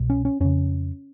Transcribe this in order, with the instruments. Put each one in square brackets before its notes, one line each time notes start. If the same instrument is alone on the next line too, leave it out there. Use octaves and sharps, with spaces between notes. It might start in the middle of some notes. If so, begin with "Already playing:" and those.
Already playing: [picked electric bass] C2 B2
C#4
C#4
F2 C#3 C#4